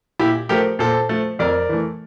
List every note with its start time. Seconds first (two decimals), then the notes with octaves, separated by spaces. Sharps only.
0.19 A#2 E4 G4
0.49 F3 A3 G4 A#4
0.79 A#2 A4 C5
1.09 F3 A3
1.39 F2 A#4 D5
1.69 E3 A3